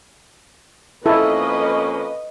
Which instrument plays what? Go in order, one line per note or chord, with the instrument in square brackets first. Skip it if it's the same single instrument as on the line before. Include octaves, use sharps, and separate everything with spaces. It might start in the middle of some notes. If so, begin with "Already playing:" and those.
[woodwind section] F2 A#3 C#4 [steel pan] E4 A4 [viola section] B4 D#5